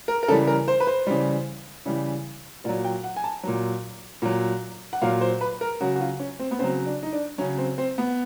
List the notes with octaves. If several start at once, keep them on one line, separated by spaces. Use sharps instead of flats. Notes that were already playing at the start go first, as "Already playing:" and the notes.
A#4
A#4
C#3 E3 G3 A4
A#4
C5
B4
C5
C#3 E3 G3
C#3 E3 G3
A#2 F#3 D5
G5
F#5
G#5
A5
A#2 F#3
A#2 F#3
F#5
A#2 F#3 F5
C5
B4
A#4
C#3 F#3 F#4
F#4
F4
C#4
C4
B3
C#3 F#3 C4
D4
D#4
D4
C#3 F#3 C#4
C4
C4
B3